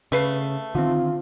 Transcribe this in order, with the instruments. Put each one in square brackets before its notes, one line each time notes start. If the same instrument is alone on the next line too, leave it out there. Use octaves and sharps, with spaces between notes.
[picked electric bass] C#3 [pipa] A3 B4 F5
[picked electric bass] D3 D#3 C4 [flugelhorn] F4